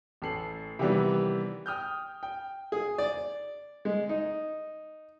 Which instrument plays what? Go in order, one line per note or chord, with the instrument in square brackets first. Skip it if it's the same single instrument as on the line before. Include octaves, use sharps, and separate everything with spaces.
[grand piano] A1 A4 C7 F#7
C3 D#3 E3 G3 B3
G5 D#6 F6 G6
G5
[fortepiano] G#4
D5
G#3
D#4